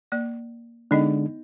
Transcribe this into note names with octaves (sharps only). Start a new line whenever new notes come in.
A#3 D5
D3 G#3 B3 D4 D#4 D#5